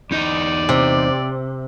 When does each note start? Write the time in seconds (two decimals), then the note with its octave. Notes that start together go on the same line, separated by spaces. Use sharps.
0.11 E2 D#4 D5 D#5
0.69 C3